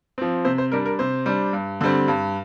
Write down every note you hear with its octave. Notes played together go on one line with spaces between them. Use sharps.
F3 C4
C3 C5
C5
G3 D4 A#4
A#4
C3 C5
G3 D4
G2
D3 G3 C4
G2